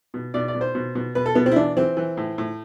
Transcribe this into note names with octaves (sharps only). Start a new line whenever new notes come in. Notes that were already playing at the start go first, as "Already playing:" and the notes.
B2
B2 D5
D5
B2
C5
B2
B2
B2 B4
A4
B2 B3
C4
E4
E3 D4
E3 C4
E3
A2
A2